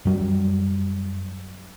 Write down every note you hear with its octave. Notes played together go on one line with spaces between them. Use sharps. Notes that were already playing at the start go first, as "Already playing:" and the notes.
F#2 F#3 G3